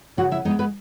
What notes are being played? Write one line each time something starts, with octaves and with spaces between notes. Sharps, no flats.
C#3 F#4 F#5
E4 E5
G#3 B3 D#4 D#5
B3 B4